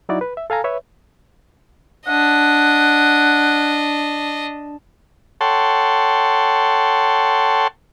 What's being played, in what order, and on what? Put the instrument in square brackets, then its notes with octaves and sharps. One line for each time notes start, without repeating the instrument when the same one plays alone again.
[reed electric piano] F#3 D#4 E4 F#4 D5
B4
E5
A4 F5 G#5 A#5
B4 C#5 E5
[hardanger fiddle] D4 D#5 [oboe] F#5
[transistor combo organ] A4 C#5 F#5 G5 A5 C6